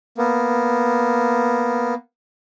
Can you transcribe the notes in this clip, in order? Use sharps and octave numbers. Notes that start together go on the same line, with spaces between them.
A#3 B3